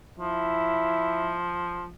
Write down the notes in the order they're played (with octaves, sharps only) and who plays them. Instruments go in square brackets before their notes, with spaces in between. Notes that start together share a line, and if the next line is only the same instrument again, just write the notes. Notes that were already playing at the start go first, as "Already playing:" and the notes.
[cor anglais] F3 [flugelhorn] E4